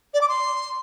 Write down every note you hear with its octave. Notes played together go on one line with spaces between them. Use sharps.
D5
D6
C6